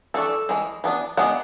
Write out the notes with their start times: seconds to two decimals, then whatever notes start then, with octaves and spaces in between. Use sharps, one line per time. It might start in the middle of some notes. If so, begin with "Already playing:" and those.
0.14 E3 A3 D4 A4
0.49 E3 G#3
0.84 E3 B3 D4
1.17 G#3 B3 D4 F#5